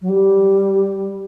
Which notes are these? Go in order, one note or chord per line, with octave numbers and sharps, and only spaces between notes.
F#3
G3